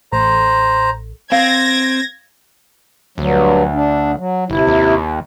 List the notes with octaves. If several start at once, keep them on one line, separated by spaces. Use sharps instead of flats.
A1 C5 A#5
C4 F5 G#6 A#6
D2 G2 F#3
D4
F#3
G1 C3 E4
D#2